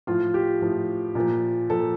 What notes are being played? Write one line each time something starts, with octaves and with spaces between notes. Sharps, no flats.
A2 F3 F4
G4
A2 F3
A#2 F3
A#2 F3 A4